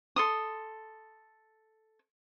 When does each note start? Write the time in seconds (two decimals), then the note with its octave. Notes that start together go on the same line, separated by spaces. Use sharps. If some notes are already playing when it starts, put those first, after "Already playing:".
0.16 A4 C6 D#6